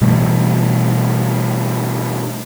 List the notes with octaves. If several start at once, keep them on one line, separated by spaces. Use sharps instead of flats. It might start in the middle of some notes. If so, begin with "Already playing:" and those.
B2 E3 G3 A3